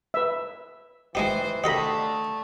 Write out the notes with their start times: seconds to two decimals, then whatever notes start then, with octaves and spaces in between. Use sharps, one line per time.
0.14 B4 E5
1.15 E3 G#3 D#4 G4 C5
1.64 D3 A3 G4 A4 D#5 B5 C6